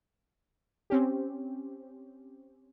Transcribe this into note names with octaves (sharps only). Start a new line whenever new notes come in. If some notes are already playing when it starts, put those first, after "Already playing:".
C4 C#4 G4